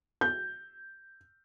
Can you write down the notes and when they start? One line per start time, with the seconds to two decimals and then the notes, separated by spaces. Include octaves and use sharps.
0.21 G6